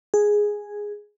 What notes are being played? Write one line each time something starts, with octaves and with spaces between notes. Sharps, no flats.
G#4